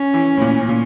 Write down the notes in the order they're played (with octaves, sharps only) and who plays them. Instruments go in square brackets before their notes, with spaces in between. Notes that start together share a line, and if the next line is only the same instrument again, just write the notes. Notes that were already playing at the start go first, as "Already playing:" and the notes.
Already playing: [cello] C#4
[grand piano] E3
A2
A#2
A#2